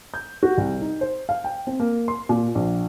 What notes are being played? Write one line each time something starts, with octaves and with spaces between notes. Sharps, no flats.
G6
F#4
C2
D#4
C5
F5
G5
C4
A#3
C6
A#2
A#1